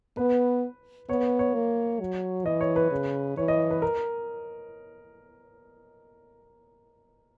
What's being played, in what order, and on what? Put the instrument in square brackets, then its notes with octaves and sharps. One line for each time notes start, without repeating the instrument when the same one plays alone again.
[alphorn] B3 [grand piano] B4
[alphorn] B3 [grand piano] C#5
[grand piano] C#5
[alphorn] A#3
F#3
[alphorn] E3 [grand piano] D#5
[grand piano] C#5
B4
[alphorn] C#3
[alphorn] E3 [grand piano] C#5
[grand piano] D#5
B4
A#4